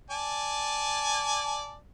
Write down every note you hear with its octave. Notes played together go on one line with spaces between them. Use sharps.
D5 G#5 A5